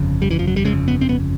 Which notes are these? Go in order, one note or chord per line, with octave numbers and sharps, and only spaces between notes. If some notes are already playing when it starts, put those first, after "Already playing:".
Already playing: G1 F2 C#3
G3
E3
F3
F#3
G3
G1 F2 C#3 G#3
B3
C4
B3